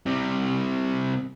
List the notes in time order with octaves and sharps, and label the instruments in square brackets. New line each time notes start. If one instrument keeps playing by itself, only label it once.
[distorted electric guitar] C3 G3